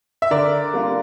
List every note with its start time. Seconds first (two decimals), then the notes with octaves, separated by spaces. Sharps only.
0.22 E5
0.31 D3 A#4 D5
0.74 G3 A#3 D4 F4